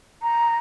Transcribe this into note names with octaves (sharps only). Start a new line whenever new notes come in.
A#5